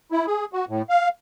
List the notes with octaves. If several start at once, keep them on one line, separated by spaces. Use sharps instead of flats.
E4
G#4
F#4
A2
F5